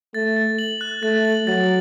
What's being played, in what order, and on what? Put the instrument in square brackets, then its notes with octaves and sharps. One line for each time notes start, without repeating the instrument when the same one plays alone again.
[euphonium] A3 [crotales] A6
[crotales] A6
F#7
F#6
[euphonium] A3 [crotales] A6
[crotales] F#7
[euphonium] F#3 [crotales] A6